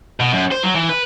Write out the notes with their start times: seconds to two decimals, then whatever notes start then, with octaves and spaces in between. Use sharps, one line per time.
0.20 B2
0.33 F#2
0.52 C5
0.64 F#3
0.75 E3
0.89 B4